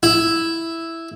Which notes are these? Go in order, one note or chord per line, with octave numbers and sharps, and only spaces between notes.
E4